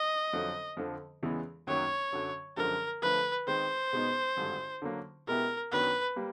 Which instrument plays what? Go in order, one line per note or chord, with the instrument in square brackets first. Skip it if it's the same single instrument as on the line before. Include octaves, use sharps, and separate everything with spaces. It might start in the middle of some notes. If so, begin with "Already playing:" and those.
Already playing: [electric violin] D#5
[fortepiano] F2 D3 F#3
F2 D3 F3
E2 C#3 E3 G#3 B3
[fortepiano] F#2 D#3 F#3 A#3 C#4 [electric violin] C#5
[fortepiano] F#2 D3 F#3
[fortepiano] F#2 D3 F3 G#3 [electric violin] A#4
[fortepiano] D3 F3 A3 [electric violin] B4
[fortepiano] D#3 G#3 C4 [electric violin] C5
[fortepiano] B2 G#3 B3 D#4
G#1 G2 D3
D3 F#3 A#3
[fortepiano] B2 G#3 B3 E4 G4 [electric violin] A#4
[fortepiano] F#2 D#3 F#3 B3 D4 [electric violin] B4
[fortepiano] G3 A#3